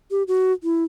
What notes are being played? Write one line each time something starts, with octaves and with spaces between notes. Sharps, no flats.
G4
F#4
E4